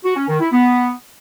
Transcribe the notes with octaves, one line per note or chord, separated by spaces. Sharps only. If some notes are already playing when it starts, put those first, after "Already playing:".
F#4
C#4
D#3
E4
B3